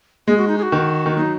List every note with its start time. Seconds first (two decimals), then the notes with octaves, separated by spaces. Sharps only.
0.28 G#3 G#4
0.38 F#4
0.48 D#4
0.58 G#4
0.63 F#4
0.72 D#3
1.06 D#3
1.17 F#3 D#4